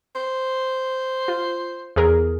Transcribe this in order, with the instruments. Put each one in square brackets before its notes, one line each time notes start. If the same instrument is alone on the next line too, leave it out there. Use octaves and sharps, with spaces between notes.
[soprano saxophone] C5
[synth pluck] F4
E2 G#4 A#4